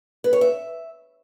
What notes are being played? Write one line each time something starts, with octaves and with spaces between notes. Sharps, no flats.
B4
C#5
E5